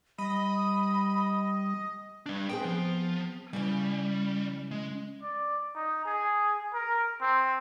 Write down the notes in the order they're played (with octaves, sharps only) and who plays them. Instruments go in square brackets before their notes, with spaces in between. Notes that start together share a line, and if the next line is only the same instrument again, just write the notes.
[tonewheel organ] G3 [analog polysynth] D#5 [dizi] B5
[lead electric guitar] G3 D4
[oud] B3 C4 G#4 [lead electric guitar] G5
[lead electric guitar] F3
[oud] C#3 E3 C#4 [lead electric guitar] G3
[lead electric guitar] G#3
[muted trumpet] D5
D#4
G#4
A#4
C4